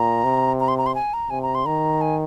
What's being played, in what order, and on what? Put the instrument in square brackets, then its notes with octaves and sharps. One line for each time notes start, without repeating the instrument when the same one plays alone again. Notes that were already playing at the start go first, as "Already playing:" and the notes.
Already playing: [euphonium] A#2 [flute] A#5
[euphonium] C3
[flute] A#5
C6
A#5
C6
G#5
A#5
[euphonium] C3 [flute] G#5
[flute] A#5
C6
[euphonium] D#3 [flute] A#5
[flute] G#5